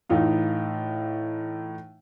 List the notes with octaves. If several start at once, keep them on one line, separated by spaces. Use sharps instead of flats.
A2 E3 D#4 F4